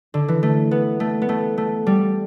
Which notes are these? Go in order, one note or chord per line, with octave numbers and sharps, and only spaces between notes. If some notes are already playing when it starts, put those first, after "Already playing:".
D3
E3
A3
B3
A3
B3
A3
A3
G3